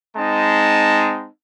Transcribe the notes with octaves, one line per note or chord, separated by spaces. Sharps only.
G#3 C4 D#4 A5